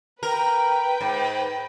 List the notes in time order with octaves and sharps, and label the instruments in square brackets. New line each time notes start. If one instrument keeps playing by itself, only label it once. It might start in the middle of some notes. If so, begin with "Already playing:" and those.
[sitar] A#4 [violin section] B4 G5
[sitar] G#2